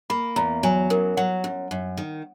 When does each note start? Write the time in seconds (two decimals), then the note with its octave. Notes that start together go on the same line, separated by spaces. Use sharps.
0.10 A#3 B5
0.36 E2 A#5
0.63 F#3 G#5
0.90 F#2 A#4
1.17 F#3 F#5
1.44 F#2
1.71 F#2
1.97 D#3